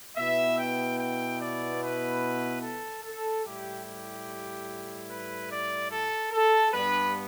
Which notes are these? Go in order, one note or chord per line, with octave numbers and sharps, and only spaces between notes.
B2 B3 E4 E5
G5
G5
D5
B4
A4
A4
A2 G3 E4 G4
G4
B4
D5
A4
A4
G2 G3 B3 D4 B4